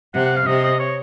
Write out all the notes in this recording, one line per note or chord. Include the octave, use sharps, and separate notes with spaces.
C3 F#5
F#5
F5
C3 D#5
D#5
C#5